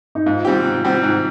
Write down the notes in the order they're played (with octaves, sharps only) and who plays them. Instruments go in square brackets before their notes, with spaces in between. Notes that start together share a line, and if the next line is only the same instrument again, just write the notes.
[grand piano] D#4
[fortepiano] G#2 [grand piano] F4
[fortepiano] G3 C4 G4
G#2
G3 C4 G4
G#2